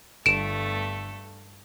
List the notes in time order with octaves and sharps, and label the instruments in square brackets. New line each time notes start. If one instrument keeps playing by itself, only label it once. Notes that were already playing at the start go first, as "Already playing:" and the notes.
[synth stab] G1 [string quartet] G2 A3 A4 [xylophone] D7 E7